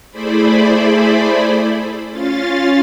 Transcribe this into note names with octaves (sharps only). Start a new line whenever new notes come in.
A3 E4 G#4 C5 D5 B5
C#4 F4 F5 A6